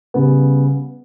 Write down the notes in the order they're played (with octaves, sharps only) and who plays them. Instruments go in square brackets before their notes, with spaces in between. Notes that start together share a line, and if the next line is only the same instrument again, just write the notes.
[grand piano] C#3 G3 B3